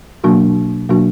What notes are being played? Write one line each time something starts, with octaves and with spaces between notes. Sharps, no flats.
B2 F#3 A#3 D4 F#4
B2 F#3 A#3 D4 F#4